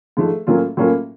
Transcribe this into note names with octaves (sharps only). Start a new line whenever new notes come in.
G#2 F3 A3
A2 F#3 A#3 C#4 F4
A2 F#3 A#3 C#4 F4